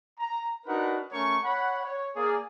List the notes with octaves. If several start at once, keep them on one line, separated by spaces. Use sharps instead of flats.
A#5
D4 D#4 F#4 A#4 B4 F#5
A3 C#4 A#4 C#5 C#6
C#5 F#5 B5
C#5
A#3 G#4 D5